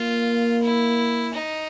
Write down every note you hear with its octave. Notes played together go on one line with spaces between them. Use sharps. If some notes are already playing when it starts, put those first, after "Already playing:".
Already playing: A#3 F4
E4
D#4